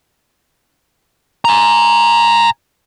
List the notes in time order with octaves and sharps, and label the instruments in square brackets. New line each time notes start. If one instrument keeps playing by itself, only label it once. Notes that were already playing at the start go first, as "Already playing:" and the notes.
[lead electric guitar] G#5 A#5